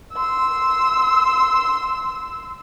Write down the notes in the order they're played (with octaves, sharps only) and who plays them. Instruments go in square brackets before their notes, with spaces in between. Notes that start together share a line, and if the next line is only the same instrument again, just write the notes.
[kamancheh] C6 E6